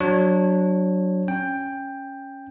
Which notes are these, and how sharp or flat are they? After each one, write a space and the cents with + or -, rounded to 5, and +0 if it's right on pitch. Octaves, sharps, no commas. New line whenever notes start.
F#3 +0 D4 +0 C#5 -25
C#4 -5 G5 +10